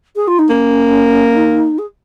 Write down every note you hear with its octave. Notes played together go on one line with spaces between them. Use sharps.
G#4
F4
D#4
A#3 C#4
D#4
G#4